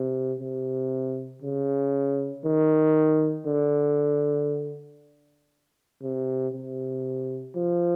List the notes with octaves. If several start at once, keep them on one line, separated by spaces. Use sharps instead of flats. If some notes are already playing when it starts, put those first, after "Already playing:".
Already playing: C3
C3
C#3
D#3
D3
C3
C3
F3